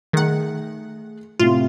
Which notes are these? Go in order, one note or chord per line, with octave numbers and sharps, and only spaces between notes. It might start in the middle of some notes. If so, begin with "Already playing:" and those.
D#3 A3 G#4 F#5
A2 C3 F4